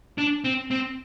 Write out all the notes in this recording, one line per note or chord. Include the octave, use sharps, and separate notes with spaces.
D4
C4
C4